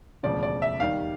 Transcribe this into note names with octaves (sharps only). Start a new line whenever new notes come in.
E1 D2 C#3 F3 D5
D5
E5
D#2 D#3 G3 F5